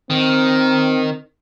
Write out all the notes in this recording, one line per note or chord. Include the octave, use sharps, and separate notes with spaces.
D#3 C4